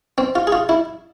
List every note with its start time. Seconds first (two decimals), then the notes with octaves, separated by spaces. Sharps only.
0.18 C4
0.35 F4
0.47 G#4
0.52 F4
0.69 E4